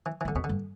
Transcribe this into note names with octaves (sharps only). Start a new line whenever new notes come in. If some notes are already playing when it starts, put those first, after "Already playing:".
E3
E3
G2
D3
E2 B2
D3
G2